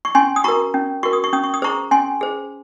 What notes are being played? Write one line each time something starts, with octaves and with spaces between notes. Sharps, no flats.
C#6
C#4 G#5 C6
D#6
F#4 A#4 A#5 C#6
C#4
F#4 A#4 C#6
D#6
C#6
C#4 D#6
C#6
D#6
G#4 C5 A#5 C#6
C#4 G#5 C6
G#4 C5